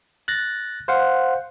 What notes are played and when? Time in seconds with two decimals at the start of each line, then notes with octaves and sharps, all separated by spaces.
0.28 F#6 A6 A#6
0.88 C5 F5 F#5